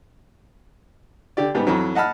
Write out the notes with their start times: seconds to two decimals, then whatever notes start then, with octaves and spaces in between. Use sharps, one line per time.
1.37 D3 G4 D5
1.55 G#2 G3 B3
1.67 F2 E3 F#3
1.95 D#5 F#5 A5 B5 F6